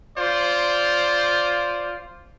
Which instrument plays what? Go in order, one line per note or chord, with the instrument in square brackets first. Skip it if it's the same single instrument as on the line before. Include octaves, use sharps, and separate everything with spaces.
[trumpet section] F4 C5 D5